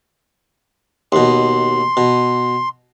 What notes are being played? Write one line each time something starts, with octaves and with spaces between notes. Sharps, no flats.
D#2 B2 C6
B2